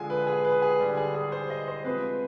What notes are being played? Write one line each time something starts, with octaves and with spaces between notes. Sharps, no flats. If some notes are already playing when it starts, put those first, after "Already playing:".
Already playing: D3 F3 G#3 G#5
B4
G#4
B4
G#4
D3 G3
G#4
G#4
C5
D#5
C5
C3 F3 G#3 B4